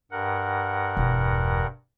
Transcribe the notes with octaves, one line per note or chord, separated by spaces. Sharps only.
G2 A#4 F#5
E1 E2